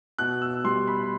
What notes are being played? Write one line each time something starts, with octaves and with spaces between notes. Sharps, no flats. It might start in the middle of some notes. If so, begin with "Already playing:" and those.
B2 F#6
E6
G3 C6
B5